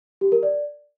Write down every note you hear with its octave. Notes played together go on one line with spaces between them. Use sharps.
G4
A#4
D5